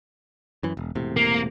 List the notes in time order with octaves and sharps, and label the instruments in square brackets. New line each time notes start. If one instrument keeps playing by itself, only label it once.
[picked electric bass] F#2 E3
E1
E1 A2 C3
[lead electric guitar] A#3